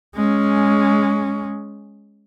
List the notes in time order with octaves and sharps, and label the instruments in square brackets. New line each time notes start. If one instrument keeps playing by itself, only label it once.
[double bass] G#3 C#4